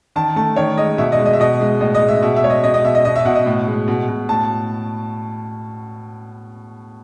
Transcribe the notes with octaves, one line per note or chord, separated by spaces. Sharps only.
D#3 A5
A3 A5
D#3 C#5
G#3 D#5
B2 E5
D#5
G#3
D#5
E5
B2 D#5
G#3
A2 D#5
D#5
G#3
E5
B2 E5
E5
G#3 C#5
D#5
B2 D#5
D#5
B2 E5
D#5
B2 D#5
E5
B2 F#5
D#5
A2
G#3
B2
B2
A2 A5